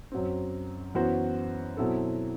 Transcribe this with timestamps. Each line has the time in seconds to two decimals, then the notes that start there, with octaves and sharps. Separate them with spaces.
0.12 F#2 F#3 C4
0.95 F#2 E3 B3 F#4 C5
1.77 B2 F#3 C4 E4 A4